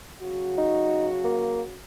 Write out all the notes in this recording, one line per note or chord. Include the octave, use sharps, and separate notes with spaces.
C#3 F#3 F#4
D#4
A#3